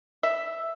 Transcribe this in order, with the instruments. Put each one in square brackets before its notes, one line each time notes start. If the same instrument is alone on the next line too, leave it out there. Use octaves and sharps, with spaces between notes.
[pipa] E5